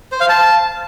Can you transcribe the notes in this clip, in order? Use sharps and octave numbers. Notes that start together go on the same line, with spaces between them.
C5
F5
A5